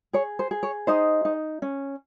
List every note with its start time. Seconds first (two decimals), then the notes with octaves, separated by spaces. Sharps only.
0.13 G#4 C#5
0.39 C5
0.51 G#4
0.63 C#5
0.87 D#4 C5 D#5
1.25 D#4
1.62 C#4